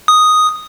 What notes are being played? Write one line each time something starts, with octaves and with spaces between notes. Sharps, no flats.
D#6